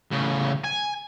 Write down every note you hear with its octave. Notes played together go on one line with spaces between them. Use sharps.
A2 C#3
G#5